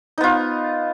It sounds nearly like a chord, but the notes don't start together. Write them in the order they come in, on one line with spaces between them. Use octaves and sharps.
D#4 B3 F4